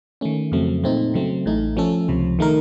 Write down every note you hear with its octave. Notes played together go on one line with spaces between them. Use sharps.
D#3 A3 C#4
F2 C#3 F#3 A3 C4
A#2 A3 C4 D#4
C#3 F#3 A3 C4
A1 A2 A3 D#4
F3 A3 C#4 A4
C#2 C3 F3
D#3 A3 D#4 A#4